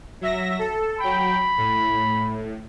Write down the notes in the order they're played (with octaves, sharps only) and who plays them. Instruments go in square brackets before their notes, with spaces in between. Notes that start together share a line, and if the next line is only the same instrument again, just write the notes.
[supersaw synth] F#3 E5 A#6
A4
[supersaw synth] F#3 G5 [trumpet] B5
[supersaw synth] A2